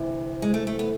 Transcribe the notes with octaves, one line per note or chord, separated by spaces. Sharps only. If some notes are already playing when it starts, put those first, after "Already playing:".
Already playing: D2 C3 E3
G#3
A3
A3
B3